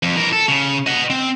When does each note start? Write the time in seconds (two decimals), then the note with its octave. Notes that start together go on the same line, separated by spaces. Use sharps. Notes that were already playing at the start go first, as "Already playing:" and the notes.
0.03 F2
0.16 E3 A#4
0.32 A4
0.48 C#3
0.87 D#5 F#5
1.10 C4